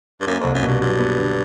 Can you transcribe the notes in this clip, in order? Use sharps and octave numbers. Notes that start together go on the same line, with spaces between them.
G2
F#2 A#3
C2 F2
F#2
G2 B2
G2 F#3
B3
D3